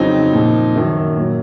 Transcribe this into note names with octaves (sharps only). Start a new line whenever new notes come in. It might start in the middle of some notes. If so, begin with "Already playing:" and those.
Already playing: F2 C#3 F#3 C4 D#4
A#2 F3
F#2 D#3 F#3
A#2 F#3